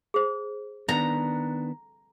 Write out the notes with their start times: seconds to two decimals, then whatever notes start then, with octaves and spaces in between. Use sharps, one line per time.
0.14 G#4 C5
0.89 D#3 B3 D4 A#5